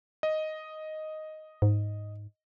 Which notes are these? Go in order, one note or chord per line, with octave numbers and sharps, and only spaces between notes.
D#5
G#2